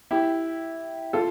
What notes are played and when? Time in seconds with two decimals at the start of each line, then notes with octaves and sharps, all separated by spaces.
0.11 E4 G4
1.13 F4 A4